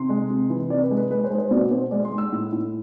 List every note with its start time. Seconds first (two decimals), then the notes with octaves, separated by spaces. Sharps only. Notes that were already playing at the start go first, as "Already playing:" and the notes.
Already playing: C3 C6
0.09 G#3
0.30 C3
0.50 E3
0.70 C3 D5
0.83 B4
0.91 G#3
0.97 B4
1.11 G#3 B4
1.24 C5
1.30 G#3
1.38 C5
1.51 B2 D5
1.71 B2 C5
1.91 G#3 D5
2.05 C6
2.11 G#3
2.18 E6
2.32 A2
2.52 A2